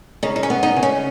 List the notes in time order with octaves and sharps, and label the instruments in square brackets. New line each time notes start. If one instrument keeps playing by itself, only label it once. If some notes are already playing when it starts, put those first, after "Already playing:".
[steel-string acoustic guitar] C#3 D#4
D#4
C#4
B3
D#4
C#3
C#4